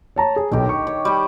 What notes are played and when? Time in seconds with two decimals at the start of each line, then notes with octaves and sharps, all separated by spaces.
0.16 C#5 A5 A#5
0.36 G#4
0.52 B1 D#3 G4
0.69 C#6
0.87 C#5
1.05 G3 G4